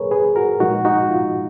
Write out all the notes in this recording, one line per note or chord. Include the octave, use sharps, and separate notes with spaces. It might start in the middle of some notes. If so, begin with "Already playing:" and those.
Already playing: A#2 F#3 A#3 G#4 A#4 B4 C#5
G#4 B4
F#4 A#4
A#2 F3 G#3 D#4 F#4
D#4 F#4
F4